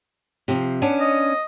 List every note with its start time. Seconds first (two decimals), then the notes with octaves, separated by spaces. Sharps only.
0.48 C3 F3
0.82 B3 C#4 D4
1.00 D#5